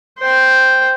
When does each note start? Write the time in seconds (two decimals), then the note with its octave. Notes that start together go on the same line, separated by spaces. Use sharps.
0.19 C5 G5